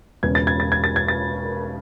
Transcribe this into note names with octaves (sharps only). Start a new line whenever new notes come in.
E1 E2 C#3 G#6
A6
G#6
A6
G#6
A6
G#6
A6